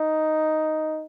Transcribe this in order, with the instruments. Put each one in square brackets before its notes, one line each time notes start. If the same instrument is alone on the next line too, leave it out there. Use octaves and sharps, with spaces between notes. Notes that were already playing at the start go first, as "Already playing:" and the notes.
Already playing: [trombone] D#4